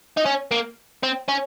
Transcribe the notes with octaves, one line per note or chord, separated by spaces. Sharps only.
D#4
C#4
A#3
C4
C#4